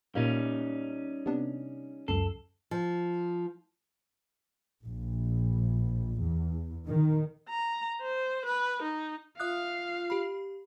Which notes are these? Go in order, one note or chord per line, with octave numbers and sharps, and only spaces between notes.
A#2 G3 A#3 C#4 D#4
C3 B3 D4
C#2 F#2 A4 C7
F3
A#1
E2
D#3
A#5
C5
B4
D#4
F4 E5 F5 D#6 F#6
G4 B5